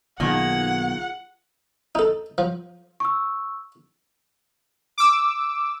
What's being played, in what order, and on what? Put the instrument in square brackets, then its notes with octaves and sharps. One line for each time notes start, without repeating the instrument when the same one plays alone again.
[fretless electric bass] B1 [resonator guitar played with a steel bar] D#3 A#3 [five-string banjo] F4 G#4 [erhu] F#5
[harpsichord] D#4 A4
F3
[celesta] C#6 E6
[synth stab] D6 E6